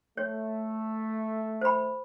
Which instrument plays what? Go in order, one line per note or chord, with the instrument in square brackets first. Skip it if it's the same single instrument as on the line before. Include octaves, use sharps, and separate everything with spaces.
[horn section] A3 [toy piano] C#5
[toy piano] C5 B5